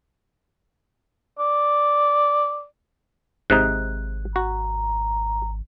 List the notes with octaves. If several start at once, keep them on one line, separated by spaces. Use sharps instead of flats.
D5
G#1 G#2 C3 D#4 F#6
F#4 A#5